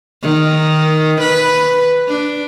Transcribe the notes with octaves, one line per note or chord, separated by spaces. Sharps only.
D#3
B4
D4